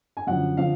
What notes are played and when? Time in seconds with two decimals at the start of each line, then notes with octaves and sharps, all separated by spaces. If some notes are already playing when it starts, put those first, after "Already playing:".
0.17 G#5
0.27 F#2 D3 F3 F#5
0.57 D3 F3 F5